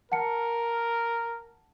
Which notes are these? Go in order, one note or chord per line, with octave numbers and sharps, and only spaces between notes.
A#4 F#5 A5 C#7